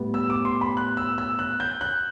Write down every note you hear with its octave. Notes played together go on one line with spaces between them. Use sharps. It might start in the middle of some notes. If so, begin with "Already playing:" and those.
Already playing: A2 G3 B3
E6
D6
C6
B5
F#6
E6
E6
F#6
G6
F#6